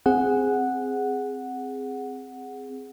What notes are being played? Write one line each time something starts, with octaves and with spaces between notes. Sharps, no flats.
C4 G#4 F#5